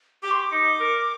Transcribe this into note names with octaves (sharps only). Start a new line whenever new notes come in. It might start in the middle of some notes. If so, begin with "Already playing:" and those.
G4 D6
C6
D6
D#4
A#4